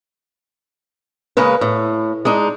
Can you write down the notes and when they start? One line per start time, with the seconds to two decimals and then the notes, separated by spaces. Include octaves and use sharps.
1.37 C#3 G#3 A#3 B4
1.61 A2
2.25 G#3 D4 D#4